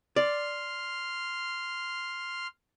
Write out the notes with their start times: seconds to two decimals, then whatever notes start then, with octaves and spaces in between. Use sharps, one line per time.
0.16 D5 C6 F6